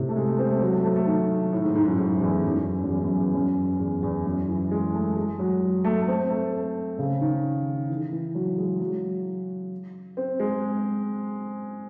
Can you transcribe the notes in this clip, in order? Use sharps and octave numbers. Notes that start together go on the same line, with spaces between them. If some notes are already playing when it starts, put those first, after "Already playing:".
Already playing: A2 C3
A3
G#3
A3
C4
A3
F#3
A3
A3
A3
D#3
A2
G#2
G#2
F#2
G#2
E2
F#2
F#2
E2
F#2
E2
F#2
E2
E2
F#2
E3
G#3
A3
G#3
F#3
A3
A3
C4
A3
C#3
D#3
E3
E3
F#3
G#3
F#3
C4
G#3